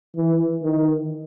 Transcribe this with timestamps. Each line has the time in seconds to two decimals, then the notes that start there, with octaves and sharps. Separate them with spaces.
0.16 E3
0.63 D#3